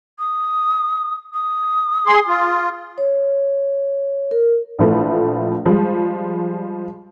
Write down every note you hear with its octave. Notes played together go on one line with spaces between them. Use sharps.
D#6
D#6
G#4 C6
F4
C#5
A#4
A#1 E3 F3 A3 B4
F3 G3 G#3